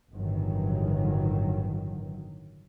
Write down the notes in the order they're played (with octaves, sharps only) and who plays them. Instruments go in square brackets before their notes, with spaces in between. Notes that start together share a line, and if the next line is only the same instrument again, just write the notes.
[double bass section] G1 A2 D#3 E3 F#3